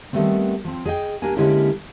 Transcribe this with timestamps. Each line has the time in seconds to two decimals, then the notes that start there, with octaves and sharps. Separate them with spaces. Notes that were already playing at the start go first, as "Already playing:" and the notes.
0.13 D#3 F3 G3 A3 B3 C4
0.64 F3 C4
0.85 G#4 D#5 E5 G5
1.22 A#3 D4 G4 A#4 G#5
1.37 D3 G#3 A#3 C#4 E4 G4